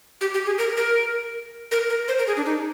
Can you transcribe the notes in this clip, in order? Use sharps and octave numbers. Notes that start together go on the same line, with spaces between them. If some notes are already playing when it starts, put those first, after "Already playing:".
G4
G4
G#4
A#4
A#4
A#4
A#4
C5
A#4
G#4
D4
D#4